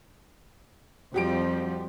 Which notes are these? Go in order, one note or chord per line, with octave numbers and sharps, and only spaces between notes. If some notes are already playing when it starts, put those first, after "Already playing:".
F2 F3 G3 C4 F#4 G4 D7